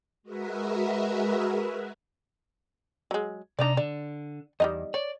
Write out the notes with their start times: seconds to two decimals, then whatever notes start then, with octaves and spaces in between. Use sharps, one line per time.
0.23 G#3 F#4 G#4 A#4 B4 E5
3.11 F#3 G#3
3.59 C3 D4 D#4 D5 A#5
3.77 D3 D5
4.60 E2 G3 D#4 D#5
4.94 C#5 D5